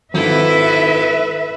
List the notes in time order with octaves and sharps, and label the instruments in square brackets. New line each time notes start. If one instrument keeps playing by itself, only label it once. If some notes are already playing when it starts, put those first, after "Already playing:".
[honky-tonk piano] G#1 D#3 [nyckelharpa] E4 A4 [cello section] B4 E5